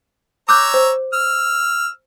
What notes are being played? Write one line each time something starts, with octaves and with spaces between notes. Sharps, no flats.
C#5 A#5 D6 E6 F#6 G6
C5
E6 F6